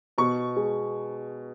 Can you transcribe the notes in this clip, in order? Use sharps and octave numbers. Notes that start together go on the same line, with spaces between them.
B2 C#6
G#3